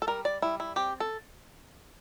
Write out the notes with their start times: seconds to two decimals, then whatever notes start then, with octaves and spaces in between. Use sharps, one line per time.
0.02 A4
0.07 G3 A#4
0.25 D5
0.42 G3 E4
0.60 E4
0.76 C4 G4
1.00 A4